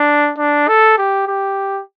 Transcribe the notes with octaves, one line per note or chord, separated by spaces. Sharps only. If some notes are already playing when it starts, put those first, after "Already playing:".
Already playing: D4
D4
A4
G4
G4